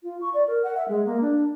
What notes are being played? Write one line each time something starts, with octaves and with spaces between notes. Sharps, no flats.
F4
C#6
D5
A#4
F#5
E5
G#3
A#3
D4